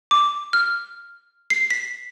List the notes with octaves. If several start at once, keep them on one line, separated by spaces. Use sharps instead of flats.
D6
F6
C7
B6